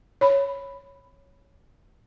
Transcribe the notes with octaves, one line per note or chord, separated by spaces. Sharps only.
C#5 B5